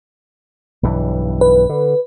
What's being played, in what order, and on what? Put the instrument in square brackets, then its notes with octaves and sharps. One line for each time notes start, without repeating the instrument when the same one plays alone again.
[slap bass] B1 G2 E3
[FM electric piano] B4
[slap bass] D3